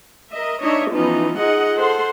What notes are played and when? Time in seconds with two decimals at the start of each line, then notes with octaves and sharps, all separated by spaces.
0.31 A#4 D#5 E5
0.61 D4 D#4 C#5 D#5 E5
0.92 E3 F3 B3 C#4 D#4
1.38 D#4 F4 G#4 D#5 F#5
1.78 A4 C5 F#5 C6